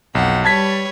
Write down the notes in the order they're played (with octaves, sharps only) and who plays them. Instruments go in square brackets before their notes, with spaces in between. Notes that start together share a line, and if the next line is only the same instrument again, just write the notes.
[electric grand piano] B1 [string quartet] F2 F#5 G5
[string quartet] G3 B4 C#5 [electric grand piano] A5 G#6 B6